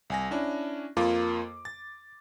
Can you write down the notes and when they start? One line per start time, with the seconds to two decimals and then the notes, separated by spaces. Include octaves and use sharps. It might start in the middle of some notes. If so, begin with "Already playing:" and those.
0.10 C2 G#5 A#6
0.31 C#4 D4 E4
0.97 F2 A#3 F4 D6
1.65 A6